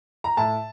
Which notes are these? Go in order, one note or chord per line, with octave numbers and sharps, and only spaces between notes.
A#5
A2 A5